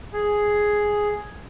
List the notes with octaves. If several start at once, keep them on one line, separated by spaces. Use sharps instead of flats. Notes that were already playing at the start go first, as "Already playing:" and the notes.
G#4